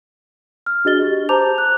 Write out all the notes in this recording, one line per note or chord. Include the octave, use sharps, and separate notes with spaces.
F6
D4 F#4 G#4 D#5 A6 G7
G4
C5 A5 A#5 D6 G6 F7
F#6